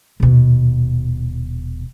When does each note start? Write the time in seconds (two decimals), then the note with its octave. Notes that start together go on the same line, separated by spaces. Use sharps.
0.20 D#1 B2